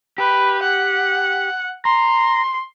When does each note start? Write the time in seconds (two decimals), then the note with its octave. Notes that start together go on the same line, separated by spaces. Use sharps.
0.18 G4 B4
0.62 F#5
1.85 A#5 C6